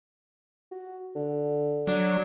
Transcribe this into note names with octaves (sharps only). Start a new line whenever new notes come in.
F#4
D3
F#3 D4